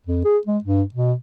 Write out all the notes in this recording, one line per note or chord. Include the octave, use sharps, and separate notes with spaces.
F2
G#4
G#3
G2
B2